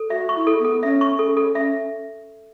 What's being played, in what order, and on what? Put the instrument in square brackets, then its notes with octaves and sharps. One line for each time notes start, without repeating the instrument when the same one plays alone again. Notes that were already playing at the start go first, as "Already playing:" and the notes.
Already playing: [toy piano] A4
[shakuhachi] F#4 [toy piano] E5
[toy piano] C#6
[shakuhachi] E4
[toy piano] A4
[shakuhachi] B3
[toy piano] A4
[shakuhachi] C#4 [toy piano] E5
[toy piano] C#6
[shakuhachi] C#4 [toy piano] A4
[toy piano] A4
[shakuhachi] C#4 [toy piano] E5